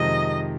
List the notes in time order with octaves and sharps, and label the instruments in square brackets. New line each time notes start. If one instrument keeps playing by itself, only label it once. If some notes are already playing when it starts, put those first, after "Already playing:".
Already playing: [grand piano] F2 C3 D#3 G#3 [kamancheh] D#5